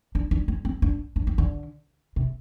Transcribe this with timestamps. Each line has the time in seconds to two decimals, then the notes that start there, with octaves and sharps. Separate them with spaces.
0.15 D4
0.31 D4
0.48 C4
0.65 C4
0.82 D4
1.16 D4
1.27 C4
1.38 D3
2.16 C3